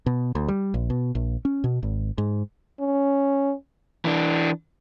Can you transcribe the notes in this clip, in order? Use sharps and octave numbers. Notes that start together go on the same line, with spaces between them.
B2
D2
G3
A#1
B2
A#1
C#4
B2
G#1
G#2
C#4
E3 D4